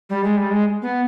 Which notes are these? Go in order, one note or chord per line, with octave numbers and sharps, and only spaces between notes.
G3
G#3
G3
G#3
B3